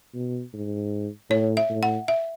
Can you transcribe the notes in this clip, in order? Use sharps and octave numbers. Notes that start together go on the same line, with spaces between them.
B2
G#2
A2 C#5
E5
A2
F#5
E5